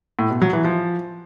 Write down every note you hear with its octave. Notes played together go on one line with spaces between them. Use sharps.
A2
B2
F#3
E3
F3